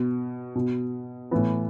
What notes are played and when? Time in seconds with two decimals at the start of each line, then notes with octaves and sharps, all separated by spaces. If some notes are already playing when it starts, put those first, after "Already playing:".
Already playing: B2
0.55 B2
1.31 A2 E3 B3